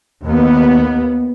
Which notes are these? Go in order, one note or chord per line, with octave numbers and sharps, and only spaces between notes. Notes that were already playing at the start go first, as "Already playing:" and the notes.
D#2 B3